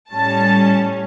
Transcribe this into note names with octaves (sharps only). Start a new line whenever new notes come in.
A2 G3 C#4 A5